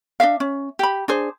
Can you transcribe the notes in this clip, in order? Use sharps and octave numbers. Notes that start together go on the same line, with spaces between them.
D4 G4 E5 F5
C#4
G4 B5
D4 G#4 C5